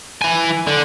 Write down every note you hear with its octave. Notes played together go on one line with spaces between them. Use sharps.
E3 G#5
D3